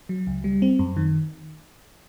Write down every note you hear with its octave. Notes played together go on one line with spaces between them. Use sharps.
F#3
C#2
G3
C4
F#2
D#3